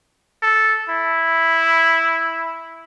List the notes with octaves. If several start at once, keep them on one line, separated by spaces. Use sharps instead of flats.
A4
E4